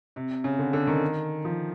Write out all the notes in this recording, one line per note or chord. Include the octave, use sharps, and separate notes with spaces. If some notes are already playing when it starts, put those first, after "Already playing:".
C3
C#3
D3
D3
D#3
F3